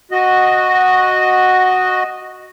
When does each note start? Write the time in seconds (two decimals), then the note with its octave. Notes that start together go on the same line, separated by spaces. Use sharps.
0.11 F#4 D#5